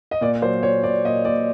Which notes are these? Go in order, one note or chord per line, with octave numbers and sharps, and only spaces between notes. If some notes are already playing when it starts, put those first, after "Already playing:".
D#5
A#2 D5
F#3 C5
A#2 C#5
A#2 D5
A#2 D#5
A#2 D5